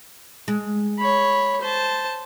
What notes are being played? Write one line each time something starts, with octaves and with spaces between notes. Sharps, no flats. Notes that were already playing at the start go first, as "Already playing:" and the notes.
G#3
C#5 B5
C5 A5